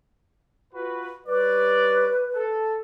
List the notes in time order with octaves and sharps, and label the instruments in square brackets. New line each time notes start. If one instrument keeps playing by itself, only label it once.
[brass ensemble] F4 F#4 B4
[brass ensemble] G3 C#5 D5 [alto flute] B4
[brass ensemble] A4